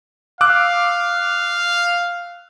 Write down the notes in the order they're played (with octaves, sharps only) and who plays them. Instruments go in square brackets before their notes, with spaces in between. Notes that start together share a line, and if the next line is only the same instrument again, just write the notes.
[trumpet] F5 [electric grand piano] D6 E6 F#6